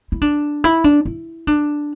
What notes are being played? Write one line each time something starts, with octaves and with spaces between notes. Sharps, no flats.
E4
D4
E4
D4
E4
D4